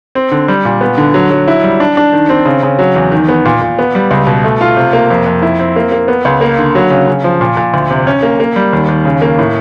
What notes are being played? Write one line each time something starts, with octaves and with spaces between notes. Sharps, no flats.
C4
D3
G3
A#2
B3
D3
F#3
F#3
E4
G3
D4
D4
D#3
C4
C#3
C#3
F#3
E2
D#3
B3
A#2
A#2
B3
G3
C#2
B2
A3
F4
C3
A#3
F2
F2
E4
C4
A#3
A#3
B3
C#2
A#3
D3
F#3
C#3
C#3
F3
A#2
A#2
D2
C3
C#4
A#3
A#3
G3
D#2
D#2
C#3
A#3
A2